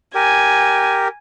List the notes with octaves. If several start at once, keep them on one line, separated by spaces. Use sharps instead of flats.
G4 A#4 G#5